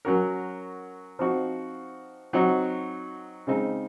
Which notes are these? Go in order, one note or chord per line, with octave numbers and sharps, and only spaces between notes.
F#3 C#4 F#4 A#4
F3 C4 D#4 F#4
F#3 C4 D#4 F#4
C#3 G#3 C4 D#4